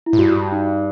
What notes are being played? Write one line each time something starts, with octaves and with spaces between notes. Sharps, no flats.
E4
A2
G2 F#4
D#4